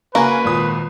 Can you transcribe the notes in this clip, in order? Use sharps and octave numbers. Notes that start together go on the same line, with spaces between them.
C#3 A#3 F#4 B4 G#5
G#1 A#2 D#6